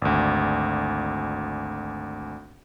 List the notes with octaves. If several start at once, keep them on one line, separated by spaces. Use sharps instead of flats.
G#1 D2